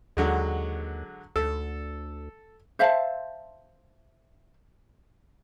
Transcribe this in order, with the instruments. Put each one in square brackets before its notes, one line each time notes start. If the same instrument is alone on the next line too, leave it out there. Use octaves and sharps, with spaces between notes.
[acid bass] D#2 [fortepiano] D3 F#3 G#3
[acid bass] D2 [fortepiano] A4
[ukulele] C5 E5 F5 A5